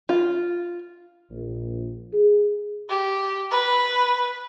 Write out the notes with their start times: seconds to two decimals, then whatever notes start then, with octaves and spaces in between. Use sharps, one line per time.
0.09 F4
1.31 A#1
2.13 G#4
2.89 G4
3.51 B4